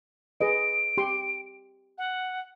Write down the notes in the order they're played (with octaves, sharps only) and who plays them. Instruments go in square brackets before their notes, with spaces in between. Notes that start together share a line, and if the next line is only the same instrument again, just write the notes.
[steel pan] G#4 B4 D#5 [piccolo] D7
[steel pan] G4 C6
[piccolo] F#5